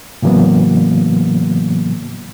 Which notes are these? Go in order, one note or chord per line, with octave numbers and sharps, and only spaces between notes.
A2 C#3 E3 F#3 A#3 B3